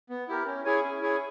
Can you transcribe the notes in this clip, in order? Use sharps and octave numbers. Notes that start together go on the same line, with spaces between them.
B3
E4 G4 A#4
C#4
E4 G#4 C#5 G#5
C#4
E4 G#4 C#5 G#5